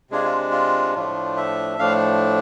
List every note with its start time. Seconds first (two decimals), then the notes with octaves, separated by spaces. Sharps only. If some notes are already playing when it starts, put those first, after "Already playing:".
0.11 C3 G#3 D4 F4 G#4
0.24 F4
0.51 F4
0.95 A2 F3 A3 D4 F4
1.37 E5
1.79 A2 F3 A3 D4 F5